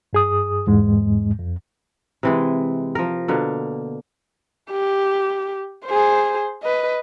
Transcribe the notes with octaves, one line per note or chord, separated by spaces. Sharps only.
G2 G#4 D#6
E2 G#2 G#3
F2
C3 E3 G#3
F3 A#4
B2 D3 A#3
G4
G#4 C5
B4 D#5